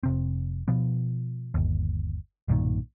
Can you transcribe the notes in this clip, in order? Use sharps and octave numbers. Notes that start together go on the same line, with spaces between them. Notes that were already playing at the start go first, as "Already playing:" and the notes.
F1 C3 C4
B2 F3 B3
G1 D#2
B1 G2 A#2 D#3